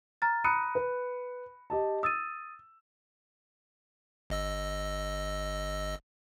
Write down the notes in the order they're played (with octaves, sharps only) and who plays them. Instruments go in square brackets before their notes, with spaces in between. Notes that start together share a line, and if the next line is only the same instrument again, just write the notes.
[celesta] A#5 F6 A6
[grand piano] A#5 D#6 C#7 [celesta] B5 F#6 D#7
[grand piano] B4
G4 D#5 A5
[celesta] D#6 A6 D#7 [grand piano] E6
[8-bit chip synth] G1 D#5 E6